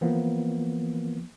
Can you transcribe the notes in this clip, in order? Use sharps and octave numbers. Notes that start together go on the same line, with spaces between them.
E3 F3 A#3 B3